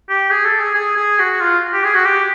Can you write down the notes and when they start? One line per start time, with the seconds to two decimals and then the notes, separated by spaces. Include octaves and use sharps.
0.09 G4
0.31 G#4
0.45 A4
0.60 G#4
0.75 G#4
0.97 G#4
1.19 F#4
1.40 F4
1.73 G4
1.84 G#4
1.95 F#4
2.05 G4